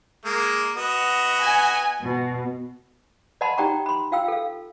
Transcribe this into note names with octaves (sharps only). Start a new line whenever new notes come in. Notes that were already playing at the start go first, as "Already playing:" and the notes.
G#3 A#3
B3 F#4 D#5
G#5
B2
D5 D#5 F#5 A5 B5 C6
D#4 G4 D5 G5 A#5 C#6
B5 C6
F4 F5 G5 E6
A4 F5